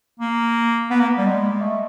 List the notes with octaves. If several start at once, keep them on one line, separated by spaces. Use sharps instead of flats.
A#3
B3
A#3
G3
G#3
A3